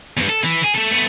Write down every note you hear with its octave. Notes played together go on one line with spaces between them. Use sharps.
E2 G2
A4
E3
G#4
A3 A4
A3 B3